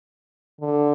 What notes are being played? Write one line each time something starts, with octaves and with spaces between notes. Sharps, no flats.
D3